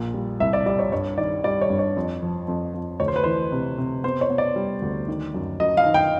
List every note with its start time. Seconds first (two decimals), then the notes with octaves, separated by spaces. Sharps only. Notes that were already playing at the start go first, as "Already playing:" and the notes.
Already playing: A#1 A#2
0.14 G3
0.40 C2 E5
0.53 D5
0.66 G3 D5
0.79 C#5
0.92 G2 C#5
1.18 D#3 D5
1.44 G3 D5
1.61 C#5
1.70 G2
1.79 C#5
1.96 F2
2.22 F3
2.48 F2
2.74 F2
3.00 D2 C#5
3.08 C5
3.16 B4
3.24 E3 C5
3.52 C3
3.78 C3
4.04 B3 C5
4.21 C#5
4.30 B3
4.38 D5
4.56 G3
4.82 D2
5.08 D#3
5.34 F#2
5.60 F#2 D#5
5.77 F5
5.86 D#3
5.94 G5